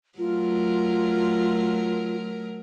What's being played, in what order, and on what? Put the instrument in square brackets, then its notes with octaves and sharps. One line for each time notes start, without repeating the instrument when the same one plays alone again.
[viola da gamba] F#3 A3 A#4 [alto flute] F4